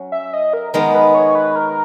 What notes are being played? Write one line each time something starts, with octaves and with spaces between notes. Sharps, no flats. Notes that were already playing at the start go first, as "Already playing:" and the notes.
Already playing: F#3 C#4
E5
D#5
A#4
D#3 G#3 B3 A#4
B4
C#5
B4
A#4